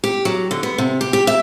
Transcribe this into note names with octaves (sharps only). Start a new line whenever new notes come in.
G4
F#3
D3
B3
C3
G4
G4
E5